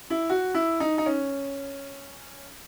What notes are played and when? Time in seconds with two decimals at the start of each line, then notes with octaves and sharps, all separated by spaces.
0.10 E4
0.30 F#4
0.55 E4
0.80 D#4
0.98 D#4
1.06 C#4